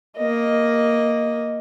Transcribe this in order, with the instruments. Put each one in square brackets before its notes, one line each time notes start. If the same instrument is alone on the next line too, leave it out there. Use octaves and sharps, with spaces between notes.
[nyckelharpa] A#3 D#5